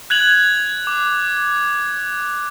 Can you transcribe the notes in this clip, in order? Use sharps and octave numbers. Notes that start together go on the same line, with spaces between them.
F#6 G#6 F7 F#7
D6